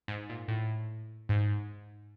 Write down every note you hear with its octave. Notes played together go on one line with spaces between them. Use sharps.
G#2
A#2
A2
G#2